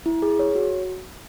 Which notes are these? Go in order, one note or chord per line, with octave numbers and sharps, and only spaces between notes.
E4
G#4
C#5
F#4